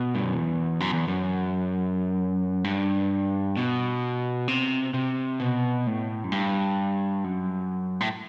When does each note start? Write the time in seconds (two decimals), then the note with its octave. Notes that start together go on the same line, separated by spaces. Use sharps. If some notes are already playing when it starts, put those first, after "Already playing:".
Already playing: B2
0.15 G2
0.24 F#2
0.34 E2
0.80 F#2
0.93 E2
1.08 F#2
2.64 G2
3.57 B2
4.48 C3
4.94 C3
5.40 B2
5.87 A2
6.24 F#2
6.32 G2
7.24 F#2
8.01 A2